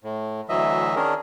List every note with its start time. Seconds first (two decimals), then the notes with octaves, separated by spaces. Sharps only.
0.04 A2
0.49 D2 E3 F#3 D#5 E5
0.96 D#3 C#4 D4 G#4 A#4